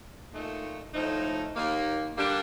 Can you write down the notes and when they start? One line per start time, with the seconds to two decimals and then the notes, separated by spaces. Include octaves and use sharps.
0.31 A#2 A3 D#4
0.93 A2 F3 A3 D#4
1.55 D#2 D#3 A#3
2.18 D3 G3 A#3 D4